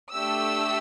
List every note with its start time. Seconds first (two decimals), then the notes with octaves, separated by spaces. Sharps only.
0.11 A3 D4 G4 E6